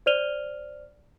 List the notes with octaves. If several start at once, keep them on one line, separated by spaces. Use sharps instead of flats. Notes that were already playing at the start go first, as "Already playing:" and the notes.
C5 D5 F6 D#7 F7 G7